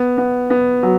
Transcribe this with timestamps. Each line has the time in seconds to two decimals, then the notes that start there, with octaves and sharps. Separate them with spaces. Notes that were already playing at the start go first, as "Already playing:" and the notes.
Already playing: B3
0.18 B3
0.50 B3
0.83 F#3